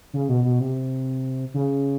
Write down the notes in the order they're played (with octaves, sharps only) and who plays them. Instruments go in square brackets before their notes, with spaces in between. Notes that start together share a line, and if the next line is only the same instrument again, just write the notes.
[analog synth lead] C#3
B2
B2
C3
C#3